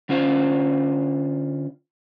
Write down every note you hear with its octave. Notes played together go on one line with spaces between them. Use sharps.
D3 C#4 F4 C5 F5